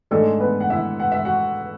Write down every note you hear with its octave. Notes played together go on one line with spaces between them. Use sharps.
G#2 G#3 A3 D4 A4
B3 B4
F#5
E4 E5
F#5
E5
F#4 F#5